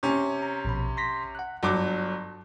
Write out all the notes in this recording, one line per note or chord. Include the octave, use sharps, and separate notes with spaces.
C3 C#4
A#5
A#1 B2 B5
C6 A#6 B6
F#5 F#6
G1 F#3 A5 D6